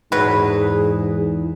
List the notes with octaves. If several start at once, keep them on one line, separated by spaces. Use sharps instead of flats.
E2 G#2 E3 F#3 G#4 B4